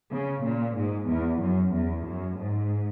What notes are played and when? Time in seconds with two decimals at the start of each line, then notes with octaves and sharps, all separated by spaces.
0.12 C#3
0.46 A#2
0.78 G#2
1.09 E2
1.42 F#2
1.73 E2
2.06 F#2
2.39 G#2